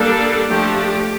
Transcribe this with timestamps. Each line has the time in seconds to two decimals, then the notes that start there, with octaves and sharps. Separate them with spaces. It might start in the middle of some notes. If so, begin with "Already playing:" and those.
Already playing: G3 A#3 D4 A4
0.50 F3 A3 D4 G4
0.79 G4